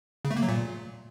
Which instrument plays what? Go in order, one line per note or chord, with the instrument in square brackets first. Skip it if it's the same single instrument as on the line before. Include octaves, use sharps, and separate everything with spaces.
[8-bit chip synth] C#3
A3
A#3
F#3
A#2